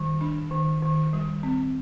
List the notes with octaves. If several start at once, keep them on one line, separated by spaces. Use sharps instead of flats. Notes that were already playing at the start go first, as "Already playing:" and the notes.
Already playing: D#3 G3
D4
D#3
D#3
G3
C4